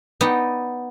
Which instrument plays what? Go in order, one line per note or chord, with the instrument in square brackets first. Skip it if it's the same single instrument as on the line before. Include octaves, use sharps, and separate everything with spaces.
[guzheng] B3 D#4 D5 D#5 G5